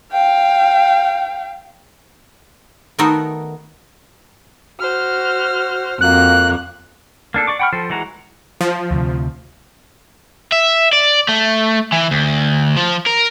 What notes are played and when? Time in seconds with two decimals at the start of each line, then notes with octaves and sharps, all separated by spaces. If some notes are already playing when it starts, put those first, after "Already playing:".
0.12 F5 G5
2.99 D#3 A3 B3 D#4 F#4 A#4
4.79 F#4 C5 F6
6.01 F2 A#3 F#4 F#6
7.34 A#3 D4 A4
7.47 D5 C#6 D6
7.59 F#5 G5 B5 C#6 F6
7.73 F3 A4 C5
7.90 E3 G#3 F#4 A#5
8.61 F3
8.91 D2 C3
10.52 E5
10.93 D5
11.29 A3
11.92 E3
12.11 D2
12.77 F3
13.06 A#4